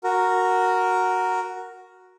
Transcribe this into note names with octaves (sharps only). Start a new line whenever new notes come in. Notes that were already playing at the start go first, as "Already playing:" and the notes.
F#4 A#4